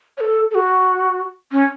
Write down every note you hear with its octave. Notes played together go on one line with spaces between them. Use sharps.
C#5
A4
A4
F#4
C#4